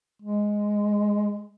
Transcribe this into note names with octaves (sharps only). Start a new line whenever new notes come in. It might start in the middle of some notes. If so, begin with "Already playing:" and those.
G#3